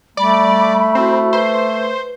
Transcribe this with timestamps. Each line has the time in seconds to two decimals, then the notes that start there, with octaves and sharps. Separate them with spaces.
0.17 G3 A3 D5 B5
0.95 C4 E4 F#4 C5
1.33 B4 C5